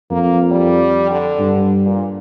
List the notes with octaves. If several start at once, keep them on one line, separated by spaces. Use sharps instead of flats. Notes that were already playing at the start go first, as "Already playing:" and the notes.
F2 A#3
G3
D3
G2
A#2